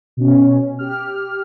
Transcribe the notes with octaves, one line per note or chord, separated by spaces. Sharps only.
B2 C#4
G4 F6